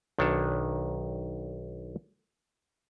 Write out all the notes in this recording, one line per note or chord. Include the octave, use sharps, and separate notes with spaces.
B1 D#3 D4 C#5 A5